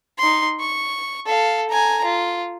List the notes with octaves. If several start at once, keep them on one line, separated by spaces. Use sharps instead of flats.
D#4 C6
C#6
A4 F5
G#5 A#5
F4